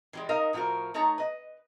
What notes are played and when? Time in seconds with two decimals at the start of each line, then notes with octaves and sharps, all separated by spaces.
0.13 E3 G3 G#3
0.29 D#4 A#4 D#5 F5
0.53 A2 F3 B3 F#4 A#4
0.94 A3 D#4 C#5 A5 A#5
1.18 B4 D#5